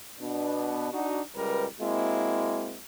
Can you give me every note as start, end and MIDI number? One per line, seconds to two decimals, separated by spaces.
0.21 0.90 47
0.21 0.90 59
0.21 0.90 62
0.92 1.20 62
0.92 1.20 63
0.92 1.20 66
1.35 1.65 37
1.35 1.65 55
1.35 1.65 70
1.35 1.65 71
1.80 2.79 56
1.80 2.79 58
1.80 2.79 60
1.80 2.79 64
1.80 2.79 66